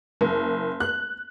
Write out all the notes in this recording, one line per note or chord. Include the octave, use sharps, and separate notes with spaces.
F#1
F#6